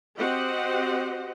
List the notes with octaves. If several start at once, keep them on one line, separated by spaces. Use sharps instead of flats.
C4 F#4 G4 C5 D#5 F#5